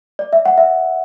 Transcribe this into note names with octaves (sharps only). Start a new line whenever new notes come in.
D5
E5
F#5
E5